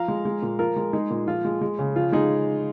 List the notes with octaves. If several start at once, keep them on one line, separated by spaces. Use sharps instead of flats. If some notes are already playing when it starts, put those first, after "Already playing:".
Already playing: F3 F5 A#5
G#3
G#3
A#2
F3 F4 A#4
G#3
G#3 D#4 G#4
A#2
F3 F4
G#3
G#3
C#3
F3 F4
G#3 D#4 G#4